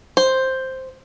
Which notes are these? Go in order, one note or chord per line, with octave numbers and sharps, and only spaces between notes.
C5